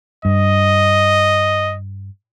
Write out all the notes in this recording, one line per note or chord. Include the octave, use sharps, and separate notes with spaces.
G2 D#5